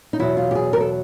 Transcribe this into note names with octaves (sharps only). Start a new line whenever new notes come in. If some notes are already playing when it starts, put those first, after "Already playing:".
D#4
E2 B2 F#3 E4
F4
G4
G#4
A#4
A4